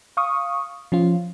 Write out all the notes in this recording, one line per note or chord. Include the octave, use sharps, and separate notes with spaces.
F5 C#6 D#6
F3 C#4 F4